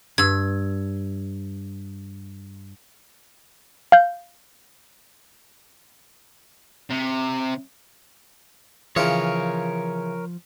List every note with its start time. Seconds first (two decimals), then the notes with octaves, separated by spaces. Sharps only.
0.18 G2 E6 G#6
3.92 F5 G6
6.90 C3
8.96 C#3 E3 F3 F4 A#4 C#5